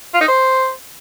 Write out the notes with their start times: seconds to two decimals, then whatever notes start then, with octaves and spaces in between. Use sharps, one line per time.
0.14 F4
0.21 D#4
0.28 C5